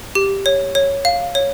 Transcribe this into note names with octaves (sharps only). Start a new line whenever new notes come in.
G4
C#5
C#5
F5
C#5